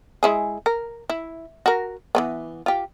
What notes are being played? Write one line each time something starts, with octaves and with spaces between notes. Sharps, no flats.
G#3 E4 G#4
A#4
E4
F#4 A#4
E3 A3 B3
F4 G4